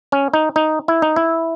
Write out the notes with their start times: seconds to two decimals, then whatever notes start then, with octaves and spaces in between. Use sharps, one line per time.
0.12 C#4
0.34 D#4
0.56 D#4
0.88 E4
1.02 D#4
1.16 E4